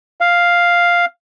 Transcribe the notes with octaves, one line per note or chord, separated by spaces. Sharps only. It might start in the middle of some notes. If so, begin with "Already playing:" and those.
F5